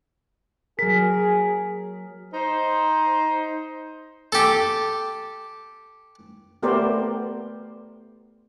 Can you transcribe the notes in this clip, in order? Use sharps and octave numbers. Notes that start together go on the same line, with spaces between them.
F#3 G#4 A#4 B6
D#4 C5
G4 A4
A3 B3 G4 A#4 C5 D5